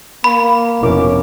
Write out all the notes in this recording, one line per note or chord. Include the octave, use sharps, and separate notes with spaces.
A#3 B5
F1 B2 C#4 E4 A#4 D6